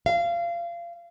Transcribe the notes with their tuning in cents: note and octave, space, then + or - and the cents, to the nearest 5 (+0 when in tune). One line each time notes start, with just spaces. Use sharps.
F5 -25